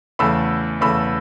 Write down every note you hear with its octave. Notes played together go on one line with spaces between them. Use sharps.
E2 C#3 A3 B5 E6
E2 C#3 A3 B5 E6